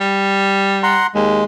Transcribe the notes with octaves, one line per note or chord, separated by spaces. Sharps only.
G3
F#5 A#5 C6
D#2 G#3